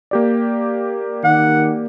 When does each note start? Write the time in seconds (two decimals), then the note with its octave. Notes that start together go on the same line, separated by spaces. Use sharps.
0.11 A#3 G4 D5
1.24 D#3 F#5